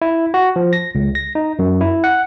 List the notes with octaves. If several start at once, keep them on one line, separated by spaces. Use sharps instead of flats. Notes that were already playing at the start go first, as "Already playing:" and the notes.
E4
F#4
F3
A#6
C#2
A#6
D#4
F#2
E4
F#5